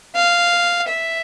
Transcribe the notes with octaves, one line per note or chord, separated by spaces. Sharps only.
F5
E5